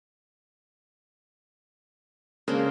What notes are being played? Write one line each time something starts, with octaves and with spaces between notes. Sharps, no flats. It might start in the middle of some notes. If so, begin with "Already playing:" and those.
C#3 G#3 A#3 C#4 D4 C5